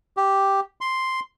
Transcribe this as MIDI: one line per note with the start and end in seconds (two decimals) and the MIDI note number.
0.17 0.60 67
0.81 1.20 84